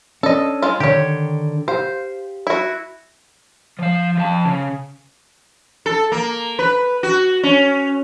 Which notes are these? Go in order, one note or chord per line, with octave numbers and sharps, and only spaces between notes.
C#4 D4 A4 D#5
G#3 F4
D3 D#3 G4 C#5
G4 C5 F5
E4 F#4
F3 F5
F2 A5
C#3
A4
A#3
B4
F#4
C#4